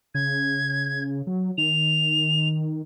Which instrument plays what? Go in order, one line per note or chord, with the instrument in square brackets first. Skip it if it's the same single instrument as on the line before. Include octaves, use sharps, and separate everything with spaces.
[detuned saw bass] C#3 [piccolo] G#6
[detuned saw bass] F#3
[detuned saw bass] D#3 [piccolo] F7